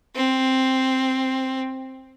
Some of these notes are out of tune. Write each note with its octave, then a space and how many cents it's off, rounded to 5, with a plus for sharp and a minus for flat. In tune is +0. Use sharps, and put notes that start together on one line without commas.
C4 +5